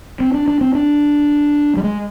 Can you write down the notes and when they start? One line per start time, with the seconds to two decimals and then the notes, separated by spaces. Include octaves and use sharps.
0.20 C4
0.34 D4
0.48 D4
0.61 C4
0.75 D4
1.77 G3
1.84 G#3